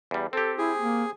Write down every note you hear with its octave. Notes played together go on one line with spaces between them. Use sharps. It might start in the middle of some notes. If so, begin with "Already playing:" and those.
E2 G3
C4 G4 A4
E4 G#4
A#3